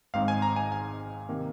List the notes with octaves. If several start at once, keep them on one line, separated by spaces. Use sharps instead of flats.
G#1 G#2 G#3 C4 D#4 F5
G#5
A#5
G#5
G#5
C3 D#3 A#3